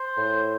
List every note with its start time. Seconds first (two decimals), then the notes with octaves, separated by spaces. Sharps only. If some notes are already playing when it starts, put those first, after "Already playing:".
Already playing: C5
0.17 A2